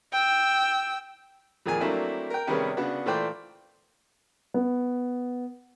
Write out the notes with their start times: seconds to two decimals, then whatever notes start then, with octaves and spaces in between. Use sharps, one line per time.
0.13 G5 E6
1.66 F2 A#2 D#3 G#4 G#5
1.81 F#3 A3 A#3 C4 D4 E4
2.30 A#4 G5
2.47 C3 D#3 G3 B3 C#4 G#4
2.77 C#3 B3 D4 F#4
3.06 A#2 E3 A3 C5 D5 G5
4.54 B3